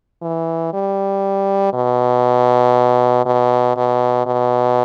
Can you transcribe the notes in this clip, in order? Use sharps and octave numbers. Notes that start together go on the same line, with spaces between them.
E3
G3
B2
B2
B2
B2